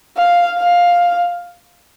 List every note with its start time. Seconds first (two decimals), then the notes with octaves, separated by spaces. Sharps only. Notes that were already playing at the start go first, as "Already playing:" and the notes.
0.17 F5
0.58 F5